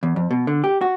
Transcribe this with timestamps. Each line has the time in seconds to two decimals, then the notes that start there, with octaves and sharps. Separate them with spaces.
0.03 E2
0.16 F2
0.31 B2
0.47 D3
0.64 G4
0.81 F#4